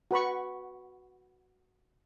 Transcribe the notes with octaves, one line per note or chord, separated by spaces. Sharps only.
F#4 B4 B5 C#6